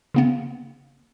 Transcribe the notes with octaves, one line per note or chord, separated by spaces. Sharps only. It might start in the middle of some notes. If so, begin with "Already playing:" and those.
C#3 A#3 B3